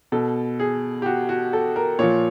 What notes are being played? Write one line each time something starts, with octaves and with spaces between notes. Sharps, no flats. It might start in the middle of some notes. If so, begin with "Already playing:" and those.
B2 A4
G#4
G4
F#4
F#4
A4
A#4
A#2 F3 C#5